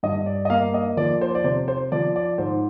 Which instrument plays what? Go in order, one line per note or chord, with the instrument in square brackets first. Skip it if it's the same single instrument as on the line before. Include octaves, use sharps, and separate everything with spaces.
[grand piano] G2 D#5
D5
D#5
A#3 F5
D#5
F3 D5
C5
D5
C3 C5
C5
F3 D5
D5
G#2 C5